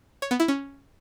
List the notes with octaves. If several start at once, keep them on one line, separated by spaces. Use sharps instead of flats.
C#5
B3
E4
C#4